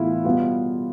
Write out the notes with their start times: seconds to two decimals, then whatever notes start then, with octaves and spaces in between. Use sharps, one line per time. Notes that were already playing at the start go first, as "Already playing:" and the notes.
Already playing: A2 E3 B3 E4 F4
0.25 B2 G3 B3 F4